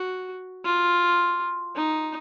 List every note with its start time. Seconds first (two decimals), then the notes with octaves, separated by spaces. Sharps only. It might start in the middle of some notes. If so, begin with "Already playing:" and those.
Already playing: F#4
0.65 F4
1.76 D#4